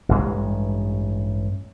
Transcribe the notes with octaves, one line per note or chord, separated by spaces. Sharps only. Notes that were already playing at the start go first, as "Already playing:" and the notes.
A1 G2 G#3